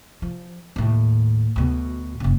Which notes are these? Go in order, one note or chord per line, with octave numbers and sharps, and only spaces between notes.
F3
D#2 A2
D2 B2
F#1 C#3